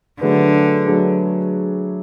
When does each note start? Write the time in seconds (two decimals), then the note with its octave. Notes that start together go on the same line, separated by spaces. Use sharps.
0.21 D3 F#3 A3 D4 G#4 B4
0.85 F#3 A3 D4 G#4 B4